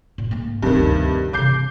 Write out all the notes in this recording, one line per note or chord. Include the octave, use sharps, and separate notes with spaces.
A#2
G#2 A#3
G2 C3 D#3 C4 D#4
D2
C3 E3 D6 G6 C7